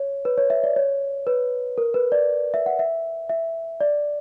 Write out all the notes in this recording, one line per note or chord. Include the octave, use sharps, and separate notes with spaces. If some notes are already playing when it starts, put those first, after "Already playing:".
Already playing: C#5
B4
C#5
E5
D5
C#5
B4
A#4
B4
D5
E5
F#5
E5
E5
D5